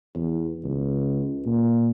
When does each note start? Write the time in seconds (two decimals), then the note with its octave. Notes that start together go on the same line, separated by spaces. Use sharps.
0.15 E2
0.64 C#2
1.45 A#2